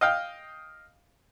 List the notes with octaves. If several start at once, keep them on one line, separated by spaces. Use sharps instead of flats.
D#5 F5 G5